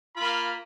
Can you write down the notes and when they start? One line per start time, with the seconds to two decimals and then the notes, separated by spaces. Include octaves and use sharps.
0.16 A#3 F4 B5